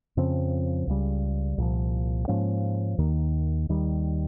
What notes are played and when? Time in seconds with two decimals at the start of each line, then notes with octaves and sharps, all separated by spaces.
0.17 F2 C#3 F3 C4
0.87 C#2 C#3 G3
1.58 C2 A#2 F3
2.28 G#2 F3 A#3 C#4
2.98 D#2 D#3 A#3
3.69 D#2 D#3 G3